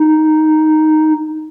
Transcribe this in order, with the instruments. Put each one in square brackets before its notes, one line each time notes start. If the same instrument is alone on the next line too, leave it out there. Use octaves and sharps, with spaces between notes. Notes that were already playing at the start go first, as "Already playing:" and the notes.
Already playing: [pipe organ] D#4